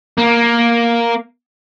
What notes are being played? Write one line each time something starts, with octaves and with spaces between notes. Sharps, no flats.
A#3